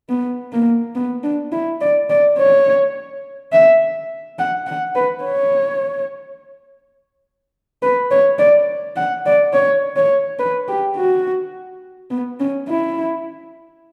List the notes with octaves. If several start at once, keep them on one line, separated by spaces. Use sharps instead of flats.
B3
A#3
B3
D4
E4
D5
D5
C#5
E5
F#5
F#5
B4
C#5
B4
C#5
D5
F#5
D5
C#5
C#5
B4
G4
F#4
B3
C#4
E4